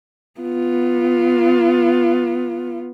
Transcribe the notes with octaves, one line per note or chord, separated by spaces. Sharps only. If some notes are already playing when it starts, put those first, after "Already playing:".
B3 F4